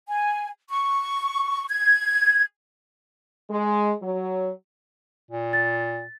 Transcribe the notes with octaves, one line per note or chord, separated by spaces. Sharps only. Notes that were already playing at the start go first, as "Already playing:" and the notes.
G#5
C#6
G#6
G#3
F#3
A#2
A6